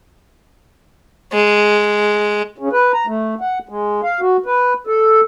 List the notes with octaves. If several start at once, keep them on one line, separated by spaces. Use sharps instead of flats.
G#3
C#3
B4
A#5
A3
F#5
G#3
F5
F#4
B4
A4